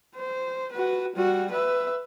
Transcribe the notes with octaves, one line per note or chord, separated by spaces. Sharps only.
C5
F#4 B4
G3 F#4
B4 E5